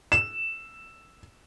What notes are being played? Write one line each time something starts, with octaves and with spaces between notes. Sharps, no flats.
E7